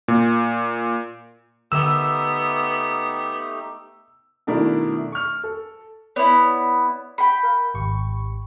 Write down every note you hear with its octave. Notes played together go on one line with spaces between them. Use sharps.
A#2
D3 A3 B3 D#4 G4 E6 E7
B2 D#3 A3 D4 E4 A#4
C#6 F6
A4
B3 E4 C#5 D5
G5 B5
A#4 F5
G#1 G4 C#6